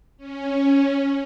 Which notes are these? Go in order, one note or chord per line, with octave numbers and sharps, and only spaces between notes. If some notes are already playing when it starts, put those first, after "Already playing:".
C#4